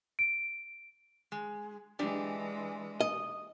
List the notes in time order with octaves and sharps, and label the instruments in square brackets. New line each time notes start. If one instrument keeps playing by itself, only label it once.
[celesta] D7
[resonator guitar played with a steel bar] G#3
[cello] E3 G#3 [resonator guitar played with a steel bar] D4 G4 D5
[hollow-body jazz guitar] D#5